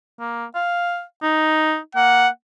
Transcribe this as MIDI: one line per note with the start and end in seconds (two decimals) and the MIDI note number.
0.20 0.45 58
0.55 1.02 77
1.22 1.77 63
1.95 2.26 58
1.95 2.29 78